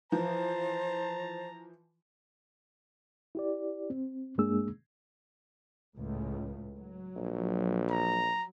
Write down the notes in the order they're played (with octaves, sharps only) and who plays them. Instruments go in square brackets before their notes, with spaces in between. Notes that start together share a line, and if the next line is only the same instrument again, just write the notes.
[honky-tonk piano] E3 F3 [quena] C5 [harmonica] A5 A#5
[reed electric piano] E4 G4 D5
C4
G2 G#3 A#3 D4 G#4 E6
[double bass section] C#2 A2
F#3
[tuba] A#1
[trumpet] A#5